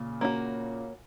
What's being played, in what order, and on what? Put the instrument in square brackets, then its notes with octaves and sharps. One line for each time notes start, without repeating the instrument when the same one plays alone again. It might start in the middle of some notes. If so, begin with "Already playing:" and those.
Already playing: [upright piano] A#2 C#3
[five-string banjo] A#3 C#4 F#4